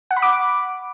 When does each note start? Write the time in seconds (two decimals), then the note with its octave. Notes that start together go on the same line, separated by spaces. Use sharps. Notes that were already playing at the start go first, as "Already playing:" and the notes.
0.11 F#5
0.16 B5
0.22 D6